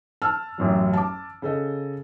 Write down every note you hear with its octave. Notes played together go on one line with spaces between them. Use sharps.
A5 E6 F6
A1 F#2 F#3
A5 D6
C#3 A4 D#5